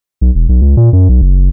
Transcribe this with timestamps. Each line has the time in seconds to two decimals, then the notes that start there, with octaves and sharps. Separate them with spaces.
0.21 B1
0.35 E1
0.49 B1
0.62 C#2
0.77 A#2
0.93 F#2
1.09 B1
1.22 F#1